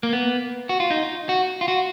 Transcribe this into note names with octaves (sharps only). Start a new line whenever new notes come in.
A#3
B3
F#4
F4
D#4
F#4
F4
F#4